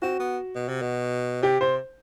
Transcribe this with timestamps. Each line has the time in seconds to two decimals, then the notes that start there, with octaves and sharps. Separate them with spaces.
0.02 C4 F#4
0.20 B3
0.55 B2
0.68 C3
0.82 B2
1.42 C3 G4
1.60 C3 C5